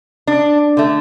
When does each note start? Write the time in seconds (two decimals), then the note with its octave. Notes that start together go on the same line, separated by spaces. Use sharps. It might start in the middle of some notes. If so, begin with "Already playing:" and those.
0.27 D4
0.77 D3 A3